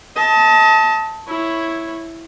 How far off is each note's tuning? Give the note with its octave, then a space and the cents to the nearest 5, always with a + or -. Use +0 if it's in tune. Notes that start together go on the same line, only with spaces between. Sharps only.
D#5 +35 A5 +0
E4 +0 C#5 -10